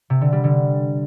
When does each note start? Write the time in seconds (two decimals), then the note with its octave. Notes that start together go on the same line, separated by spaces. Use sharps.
0.10 C3
0.21 D3
0.33 G3
0.44 D3